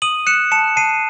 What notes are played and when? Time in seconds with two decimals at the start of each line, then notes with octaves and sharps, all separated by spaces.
0.02 D#6 D#7 F#7
0.27 F#6 C#7 E7
0.52 A5 C#7 E7
0.76 A5 C7 D#7